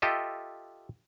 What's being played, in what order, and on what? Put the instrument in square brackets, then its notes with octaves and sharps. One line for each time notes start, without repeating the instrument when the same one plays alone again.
[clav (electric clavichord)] F4 G4 A4 D#5 E5